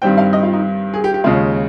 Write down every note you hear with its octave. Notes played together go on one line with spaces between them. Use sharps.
G2 D#3 G3 C4 G5
F5
D#5
F4
D#4
G#4
G4
G4
D#2 C#3 G#3 F4